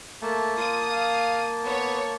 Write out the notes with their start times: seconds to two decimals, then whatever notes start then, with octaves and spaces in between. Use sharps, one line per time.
0.22 A3 A#3 A5
0.57 F4 D#6
0.89 F5
1.64 B3 C#5